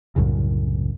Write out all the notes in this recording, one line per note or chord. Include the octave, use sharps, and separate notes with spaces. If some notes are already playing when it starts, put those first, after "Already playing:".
C2 F#2 A2 C#3